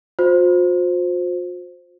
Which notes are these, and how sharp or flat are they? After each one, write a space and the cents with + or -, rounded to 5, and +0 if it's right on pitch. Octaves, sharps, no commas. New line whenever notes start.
F4 +45 C5 +0